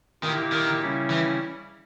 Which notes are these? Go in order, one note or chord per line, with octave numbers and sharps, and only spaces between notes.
A#2 D#3 A#3 E4 G4
D#3
C#3 G3 C#4 E4
E3